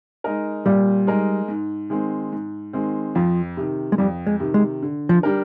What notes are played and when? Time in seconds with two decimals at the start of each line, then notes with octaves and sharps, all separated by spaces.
0.24 G#3 D#4 A#4
0.66 A#2 G3
1.07 G#3 D#4 A#4
1.48 G#2
1.90 D#3 G#3 C4
2.33 G#2
2.73 D#3 G#3 C4
3.15 F2 F3
3.57 C3 D#3
3.92 G#3
3.98 F2 G3
4.27 G#3
4.40 C3 D#3
4.54 G#3
4.82 D3
5.09 F3
5.23 G3 D4 G4 A#4